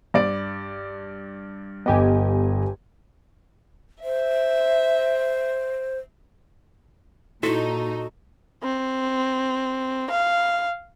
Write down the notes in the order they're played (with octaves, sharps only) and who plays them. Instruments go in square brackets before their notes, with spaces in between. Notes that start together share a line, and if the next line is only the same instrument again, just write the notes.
[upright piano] G2 D5 D7
[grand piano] G1 D#5 [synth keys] B3 G4 G#5
[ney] C5 [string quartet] E5
[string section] A#2 D#4 [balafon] E4 [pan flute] F#4 [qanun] A4
[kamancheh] C4
F5